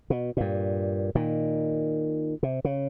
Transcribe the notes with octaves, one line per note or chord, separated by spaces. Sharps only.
B2
G2 A#2
A#2 D#3
C3
C#3